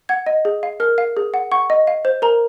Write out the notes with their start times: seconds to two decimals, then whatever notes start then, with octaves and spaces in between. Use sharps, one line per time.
0.09 F#5 G#6
0.26 D#5
0.45 G#4
0.63 F5
0.80 A#4 F6
0.98 F5
1.17 G#4
1.34 F#5
1.52 F#5 C#6
1.70 D#5
1.87 F5
2.05 C5
2.22 A#4 A#5